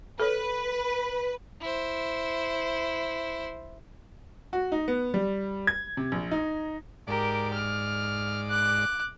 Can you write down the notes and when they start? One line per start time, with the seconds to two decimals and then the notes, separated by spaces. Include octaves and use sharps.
0.20 A4 B4 C#5
1.61 E4 C5
4.53 F#4
4.72 D#4
4.88 B3
5.14 G3
5.67 G#6
5.97 C3
6.12 A#1
6.31 D#4
7.07 G#2 G4 A#4 D5
7.53 F6
8.50 D6 F#6